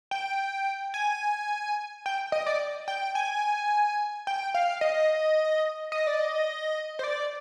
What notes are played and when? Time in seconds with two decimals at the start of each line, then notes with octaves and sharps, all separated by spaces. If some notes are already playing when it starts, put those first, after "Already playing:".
0.11 G5
0.94 G#5
2.06 G5
2.32 D#5
2.46 D5
2.88 G5
3.15 G#5
4.27 G5
4.54 F5
4.81 D#5
5.92 D#5
6.07 D5
6.21 D#5
6.99 C5
7.04 D5